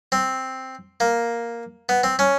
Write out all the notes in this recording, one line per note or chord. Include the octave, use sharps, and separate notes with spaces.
C4
A#3
B3
C4
C#4